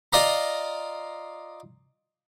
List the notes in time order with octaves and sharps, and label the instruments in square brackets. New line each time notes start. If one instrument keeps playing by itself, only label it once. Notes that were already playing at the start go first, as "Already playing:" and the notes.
[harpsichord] F4 D5 D#5 F5 A#5